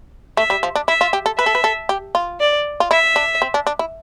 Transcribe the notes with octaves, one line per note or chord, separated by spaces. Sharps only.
A3 E5
G3
F3
D4
E4 E5
F4
G4
A4
B4 E5
A4
B4
A4
G4
F4
D5
F4
E4 E5
D4
C4
D4
D4
E4